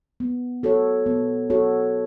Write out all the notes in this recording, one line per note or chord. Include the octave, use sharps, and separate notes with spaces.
B3
F#4 A4 C#5
B3
F#4 A4 C#5